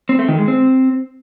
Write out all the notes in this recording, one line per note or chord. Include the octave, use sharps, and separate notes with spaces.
C4
A3
D#3
G#3
C4